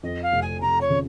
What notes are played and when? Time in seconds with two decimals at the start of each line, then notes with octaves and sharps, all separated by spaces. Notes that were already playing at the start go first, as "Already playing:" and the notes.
0.03 F2 D#5
0.22 F5
0.33 F1
0.42 G#5
0.61 F1 A#5
0.81 C#5
0.90 C#3